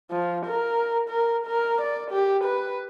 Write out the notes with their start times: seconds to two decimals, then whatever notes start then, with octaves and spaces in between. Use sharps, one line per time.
0.10 F3
0.46 A#4
1.09 A#4
1.46 A#4
1.81 D5
2.11 G4
2.44 B4